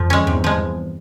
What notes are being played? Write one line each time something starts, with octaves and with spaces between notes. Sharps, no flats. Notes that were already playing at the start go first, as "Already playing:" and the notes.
Already playing: F2 F3
G#3 C#4
E2 G2 C3
F3 G#3